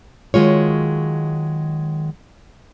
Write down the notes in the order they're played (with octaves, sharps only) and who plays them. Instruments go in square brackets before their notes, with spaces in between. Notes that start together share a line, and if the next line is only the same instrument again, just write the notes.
[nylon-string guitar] D#3 F#3 G#3 F4 C#5